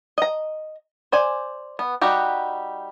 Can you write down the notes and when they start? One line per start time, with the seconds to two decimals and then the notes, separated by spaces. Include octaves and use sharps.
0.18 D#5 A#5
1.12 C5 D5 G#5
1.79 B3
2.01 G3 D#4 F#4 G4